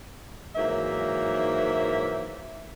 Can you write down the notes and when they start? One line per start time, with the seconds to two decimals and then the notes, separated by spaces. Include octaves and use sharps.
0.56 G#2 E3 F#3 A#3 E5